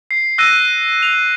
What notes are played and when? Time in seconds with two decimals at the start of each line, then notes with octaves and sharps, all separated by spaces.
0.11 C7
0.38 E6 F#6 A#6 D#7
1.03 F7